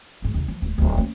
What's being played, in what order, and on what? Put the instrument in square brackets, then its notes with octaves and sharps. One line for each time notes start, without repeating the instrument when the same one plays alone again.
[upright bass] G#2 D3
D#2 C3
F3
D1 G#3
D1 D2
A#3 C#4